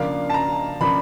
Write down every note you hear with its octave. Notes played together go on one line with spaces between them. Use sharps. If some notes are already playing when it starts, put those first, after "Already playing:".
Already playing: C#3 F3 A#3 D4 F5
A5
A#5
C#3 F3 A#3 D4 B5